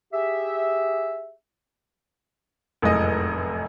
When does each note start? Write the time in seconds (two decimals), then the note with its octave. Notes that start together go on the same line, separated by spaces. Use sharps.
0.13 G4 G#4 E5
2.82 F1 F#2 A2 G#3 D#5 D#6